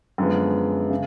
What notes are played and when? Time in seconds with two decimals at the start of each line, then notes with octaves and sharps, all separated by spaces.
0.18 F#2 D3 F3 G#3 B3
0.90 C#3